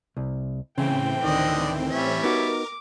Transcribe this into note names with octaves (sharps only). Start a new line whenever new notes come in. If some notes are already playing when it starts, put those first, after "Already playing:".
C2
A2 C#3 E3 C4 G5
D2 D3 D#3 D5 D#5
G3 C#4 E5
B3 D#4 F#4 A#4 D6